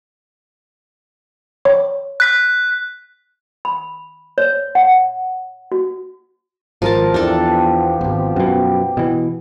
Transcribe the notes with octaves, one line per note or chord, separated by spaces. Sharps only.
C#5
F#6 B6
B5
C#5
F#5
F#4
G#1 F3 A#4 A5
E2 F3 B3 D4 G4 A4
D#1 G#1
F#2 B2
B2 E3